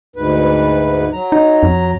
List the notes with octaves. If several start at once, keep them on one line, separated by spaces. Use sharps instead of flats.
D2 G#2 B4
F#3 A#5
D#4
F2